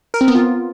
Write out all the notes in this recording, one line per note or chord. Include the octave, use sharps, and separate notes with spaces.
A#4
C4
B3
F4